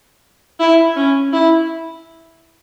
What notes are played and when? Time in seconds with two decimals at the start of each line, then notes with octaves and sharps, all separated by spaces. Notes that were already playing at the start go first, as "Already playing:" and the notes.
0.60 E4
0.96 C#4
1.33 E4